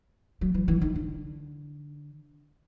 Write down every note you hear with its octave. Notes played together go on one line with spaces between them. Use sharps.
F#3
E3
E3
D#3
D3